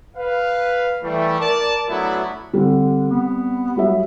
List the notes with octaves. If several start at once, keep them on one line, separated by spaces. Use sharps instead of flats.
B4 F5
E3 G3 A3
A#4 D5 A5
F#3 A3 B3 D4 E4
D3 G3 C4
B3
F#3 G3 E5